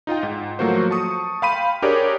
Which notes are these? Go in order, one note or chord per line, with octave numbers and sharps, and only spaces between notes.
D#4 F4 D#5 G5
G#2
F3 F#3 A3 A#3 F#4 C5
A5 C#6 D#6 C#7
F5 G5 B5 C6 D#7
D4 G4 G#4 A#4 C#5 D5